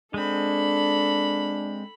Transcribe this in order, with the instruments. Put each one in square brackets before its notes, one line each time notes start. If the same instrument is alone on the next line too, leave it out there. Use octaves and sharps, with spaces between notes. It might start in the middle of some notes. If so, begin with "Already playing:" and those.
[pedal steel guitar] G#3 C4 [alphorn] D4 [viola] A4 B5